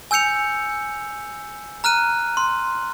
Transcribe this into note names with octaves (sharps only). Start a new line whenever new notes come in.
G#5 E6 G6 C#7 F7
A#5 F6 F#6 D#7
C6